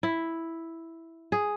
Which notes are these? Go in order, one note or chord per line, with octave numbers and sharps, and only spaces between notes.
E4
G#4